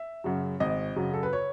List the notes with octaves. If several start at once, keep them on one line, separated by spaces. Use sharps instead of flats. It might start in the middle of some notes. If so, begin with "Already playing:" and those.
Already playing: E5
F#2 C#3 F#3
G#1 D#5
F#2 C#3 F#3
A4
B4
C#5